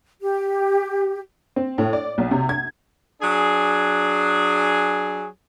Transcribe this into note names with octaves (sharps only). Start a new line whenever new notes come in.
G4
C4
A2
D5
B1
C3
G#6
F#3 D4 G#4